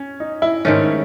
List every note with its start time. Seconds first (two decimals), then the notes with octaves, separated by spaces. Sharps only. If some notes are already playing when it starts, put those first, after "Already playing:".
Already playing: C#4
0.20 D#4
0.42 E4
0.65 G#2 D#3 A3 C#4